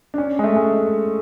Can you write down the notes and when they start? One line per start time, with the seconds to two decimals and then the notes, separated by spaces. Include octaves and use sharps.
0.14 D4
0.18 C#4
0.39 G#3
0.44 A3
0.56 G#3